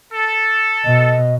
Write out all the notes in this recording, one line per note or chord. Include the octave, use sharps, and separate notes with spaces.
A4
B2 D#5